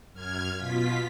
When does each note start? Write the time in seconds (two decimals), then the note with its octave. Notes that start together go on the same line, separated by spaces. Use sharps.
0.13 F#2 F6 G#6
0.57 B2 F4 B6